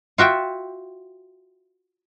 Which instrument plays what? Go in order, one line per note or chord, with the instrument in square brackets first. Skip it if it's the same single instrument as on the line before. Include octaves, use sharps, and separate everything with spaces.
[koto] F4 F#4 E5 G5